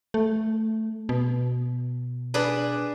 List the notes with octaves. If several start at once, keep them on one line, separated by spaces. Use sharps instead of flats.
A3
B2
D4 G#4 B4